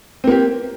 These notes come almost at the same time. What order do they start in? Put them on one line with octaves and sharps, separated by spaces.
C4 A#3 G4